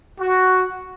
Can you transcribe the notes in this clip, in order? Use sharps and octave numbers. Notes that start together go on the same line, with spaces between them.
F#4